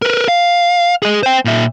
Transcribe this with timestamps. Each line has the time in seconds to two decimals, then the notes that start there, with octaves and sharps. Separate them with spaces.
0.02 A#4 B4
0.28 F5
1.02 G#4 D#5
1.23 C5 G5
1.45 A#2 E5